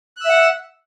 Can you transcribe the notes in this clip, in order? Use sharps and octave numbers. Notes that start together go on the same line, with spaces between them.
E5 F#5 E6 F#6